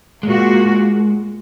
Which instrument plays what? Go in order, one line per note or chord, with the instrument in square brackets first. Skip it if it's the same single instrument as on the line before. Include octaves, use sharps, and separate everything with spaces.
[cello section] A#2 A#3 F#4 [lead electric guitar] G#3